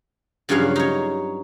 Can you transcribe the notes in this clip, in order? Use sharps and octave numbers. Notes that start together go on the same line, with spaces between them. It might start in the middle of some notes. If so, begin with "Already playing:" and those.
G2 C#3 F3 F#3 C#4 F5
D#4 C#5